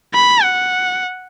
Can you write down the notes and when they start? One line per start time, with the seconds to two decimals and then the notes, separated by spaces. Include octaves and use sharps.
0.14 B5
0.43 F#5